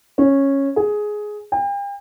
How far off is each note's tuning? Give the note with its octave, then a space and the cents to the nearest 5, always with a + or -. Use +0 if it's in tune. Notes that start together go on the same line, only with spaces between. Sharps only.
C#4 -10
G#4 +10
G5 +40